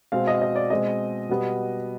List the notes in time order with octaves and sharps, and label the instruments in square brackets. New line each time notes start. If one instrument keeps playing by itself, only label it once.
[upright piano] B2 G#3 C4 F5
D#5
F5
D#5
D5
B2 G#3 C4 D#5
B2 G3 B3